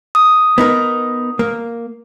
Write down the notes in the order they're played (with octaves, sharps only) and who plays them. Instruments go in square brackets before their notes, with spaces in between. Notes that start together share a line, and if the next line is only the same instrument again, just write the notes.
[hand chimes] D#6
[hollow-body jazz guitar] B3 D#4 A#4
A#3